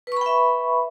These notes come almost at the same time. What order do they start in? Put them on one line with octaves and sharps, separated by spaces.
B4 C#6 B5 G5 E5